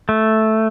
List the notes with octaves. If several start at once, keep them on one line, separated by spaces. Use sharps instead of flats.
A3